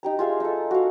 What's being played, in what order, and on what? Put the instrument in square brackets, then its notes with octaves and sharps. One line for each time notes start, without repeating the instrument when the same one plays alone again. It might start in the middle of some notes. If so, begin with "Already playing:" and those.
[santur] D#4 G4 A#5
F4 G#4 E5 F5
D#4 A4
F#4 F5